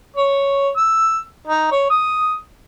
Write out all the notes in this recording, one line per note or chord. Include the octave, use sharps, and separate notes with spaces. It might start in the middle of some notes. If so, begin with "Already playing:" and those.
C#5
E6
D#4
C#5
D#6